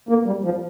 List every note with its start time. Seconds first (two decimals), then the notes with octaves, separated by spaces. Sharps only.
0.09 A#3
0.26 G3
0.44 F3